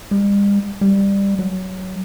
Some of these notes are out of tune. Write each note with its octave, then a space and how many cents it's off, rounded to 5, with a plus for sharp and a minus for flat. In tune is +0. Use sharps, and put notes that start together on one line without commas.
G3 +45
G3 +15
F#3 +15